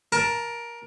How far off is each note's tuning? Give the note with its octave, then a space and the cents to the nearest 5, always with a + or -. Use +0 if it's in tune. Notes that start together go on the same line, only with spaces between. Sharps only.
A#4 +15 A5 +0